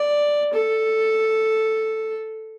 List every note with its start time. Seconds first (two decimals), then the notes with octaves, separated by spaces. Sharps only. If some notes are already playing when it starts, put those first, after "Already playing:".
Already playing: D5
0.53 A4